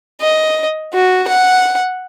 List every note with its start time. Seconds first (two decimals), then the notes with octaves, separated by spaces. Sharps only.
0.21 D#5
0.93 F#4
1.28 F#5